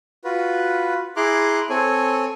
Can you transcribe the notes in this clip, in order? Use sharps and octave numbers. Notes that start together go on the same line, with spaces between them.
F4 F#4 B4
E4 G#4 A#5 C6 D6 F#6
C4 A4 C#5 G#5